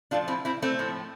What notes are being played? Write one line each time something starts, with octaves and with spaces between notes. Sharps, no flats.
A2 F3 A3 D4 F4
C4 E4
C4 E4
A3 C4
A2 F3 A3